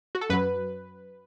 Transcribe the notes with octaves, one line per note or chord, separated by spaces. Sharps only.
F#4
A4
F#2 F#3 B4